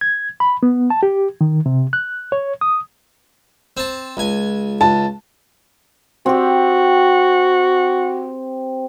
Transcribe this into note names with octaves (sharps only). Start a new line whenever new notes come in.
G#6
B5
B3
A5
G4
D#3
C3
F#6
C#5
D#6
C4 A5
C#2 G#5
C#2 A5
C4 F#4 G4